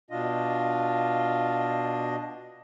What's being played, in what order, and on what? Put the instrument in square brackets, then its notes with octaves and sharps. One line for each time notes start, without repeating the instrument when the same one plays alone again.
[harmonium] B2 D4 D#5 [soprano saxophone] F4